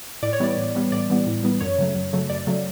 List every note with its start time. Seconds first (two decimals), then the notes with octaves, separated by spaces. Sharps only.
0.23 A2 D5
0.33 C#5
0.40 E3 G3 B3 D5
0.57 A2
0.75 E3 G3 B3
0.92 A2 D5
1.10 E3 G3 B3
1.27 A2
1.43 E3 G3 B3
1.60 F#2 C#5
1.78 C#3 F#3 A3
1.95 F#2
2.13 C#3 F#3 A3
2.30 F#2 D5
2.47 C#3 F#3 A3